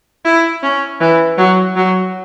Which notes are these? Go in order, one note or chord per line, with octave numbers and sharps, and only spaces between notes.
E4
C#4
E3
F#3
F#3